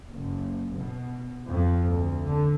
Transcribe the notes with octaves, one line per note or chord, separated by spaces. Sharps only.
F#1
B2
F2
D2
D3